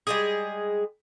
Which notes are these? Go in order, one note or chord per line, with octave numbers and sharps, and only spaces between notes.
G3 G#3 G#4